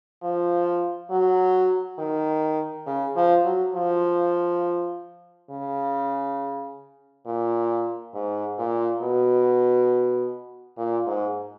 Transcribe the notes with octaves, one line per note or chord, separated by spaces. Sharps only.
F3
F#3
D#3
C#3
F3
F#3
F3
C#3
A#2
G#2
A#2
B2
A#2
G#2